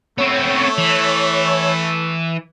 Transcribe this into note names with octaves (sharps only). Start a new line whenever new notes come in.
A3 B3 C4 C#5
E3